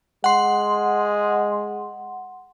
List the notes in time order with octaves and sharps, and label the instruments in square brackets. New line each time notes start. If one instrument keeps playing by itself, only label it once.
[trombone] G#3 [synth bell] F#5 C6